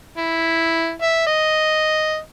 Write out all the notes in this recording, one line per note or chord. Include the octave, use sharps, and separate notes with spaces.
E4
E5
D#5